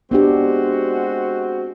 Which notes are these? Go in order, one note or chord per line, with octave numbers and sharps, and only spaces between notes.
G#3 B3 C4 D4 F#4 G4